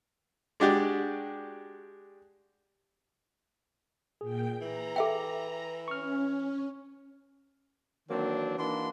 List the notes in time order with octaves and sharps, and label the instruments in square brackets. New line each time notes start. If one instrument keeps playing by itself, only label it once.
[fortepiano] G#3 D4 F#4 G4 D5
[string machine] A#2 G5 [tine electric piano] G#4
[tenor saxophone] E3 [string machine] A#5
[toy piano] A4 E5 G5
[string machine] C#4 [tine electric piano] C#6 F6
[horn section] D#3 E3 F#3 A#3 C4 D4
E3 A#3 D4 D#4 F#4 C6